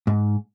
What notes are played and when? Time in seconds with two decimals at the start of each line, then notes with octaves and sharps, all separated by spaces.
0.07 G#2